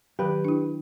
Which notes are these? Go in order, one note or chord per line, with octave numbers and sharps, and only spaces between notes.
D#3 F#3 G4 B4
D4 E4